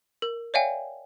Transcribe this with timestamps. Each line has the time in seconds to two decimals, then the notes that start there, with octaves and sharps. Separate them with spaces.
0.22 A#4
0.54 C#5 D5 E5 F5 G5 G#5